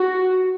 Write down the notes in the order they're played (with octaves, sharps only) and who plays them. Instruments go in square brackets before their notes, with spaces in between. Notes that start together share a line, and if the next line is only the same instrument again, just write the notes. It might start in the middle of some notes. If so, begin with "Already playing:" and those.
Already playing: [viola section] F#4